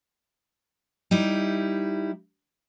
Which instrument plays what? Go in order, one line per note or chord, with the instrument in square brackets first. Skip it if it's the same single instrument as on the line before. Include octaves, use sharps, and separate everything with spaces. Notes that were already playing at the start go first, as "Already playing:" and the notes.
[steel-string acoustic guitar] G3 D#4 E4